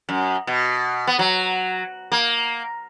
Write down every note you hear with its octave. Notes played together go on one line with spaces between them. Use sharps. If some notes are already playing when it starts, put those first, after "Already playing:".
F#2
B2
B3
F#3
A#3